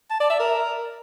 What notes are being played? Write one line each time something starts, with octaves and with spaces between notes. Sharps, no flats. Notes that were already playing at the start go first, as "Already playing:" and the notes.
A5
D5
E5
A#4